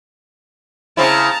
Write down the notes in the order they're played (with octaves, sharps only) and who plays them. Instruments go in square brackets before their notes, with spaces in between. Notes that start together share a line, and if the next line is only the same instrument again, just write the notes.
[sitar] C#3 C4 E4 [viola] A5 A#5